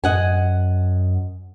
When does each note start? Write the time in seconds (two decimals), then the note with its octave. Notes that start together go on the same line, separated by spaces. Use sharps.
0.04 F#2 D#5 F#5 G#5